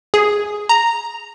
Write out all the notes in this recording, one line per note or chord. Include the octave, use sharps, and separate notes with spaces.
G#4
A#5